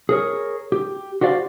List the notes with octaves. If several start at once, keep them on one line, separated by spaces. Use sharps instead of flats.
G#4 A#4 C#5
G4
F#4 G4 C5 D5 F5